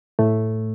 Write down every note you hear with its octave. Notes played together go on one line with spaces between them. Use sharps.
A2 A3